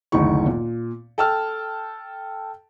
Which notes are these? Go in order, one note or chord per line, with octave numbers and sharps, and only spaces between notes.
F#1 D2 D#3 D#4 E4 C#6
A#2
A4 G5 A5 E6 F6